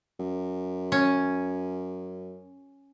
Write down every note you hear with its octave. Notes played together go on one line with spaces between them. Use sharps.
F#2
C#4